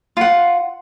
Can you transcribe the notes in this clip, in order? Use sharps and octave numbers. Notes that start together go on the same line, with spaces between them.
F4 F#5